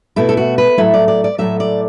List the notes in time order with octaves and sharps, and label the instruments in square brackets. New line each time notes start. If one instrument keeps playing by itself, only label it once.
[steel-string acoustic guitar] B2 A3 E4
A4
F#4
B4
A2 F#3 A3 E4
D5
D5
D5
A2 F#3 A3 E5
D5